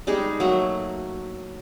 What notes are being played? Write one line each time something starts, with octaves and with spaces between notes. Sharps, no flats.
G3 G#3 D#4 G#4
F#3 A3 A#3 F#5